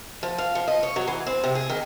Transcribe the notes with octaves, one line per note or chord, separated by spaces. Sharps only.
F3
F5
F3
D#5
C#5
F#3
E3
C4
C3
G#4
D#3